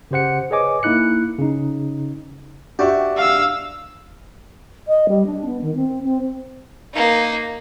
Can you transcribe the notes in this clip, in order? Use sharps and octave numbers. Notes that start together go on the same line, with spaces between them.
C#3 G4 C5 F#5 C#7
G#4 B4 C#5 D#5 G#5 D6
A#3 D#4 E4 F#6 C#7
C#3 D#4
D4 F#4 G4 D5 E5
F5 E6
D#5
G3
D4
B3
D#3
C4
C4
A#3 D#4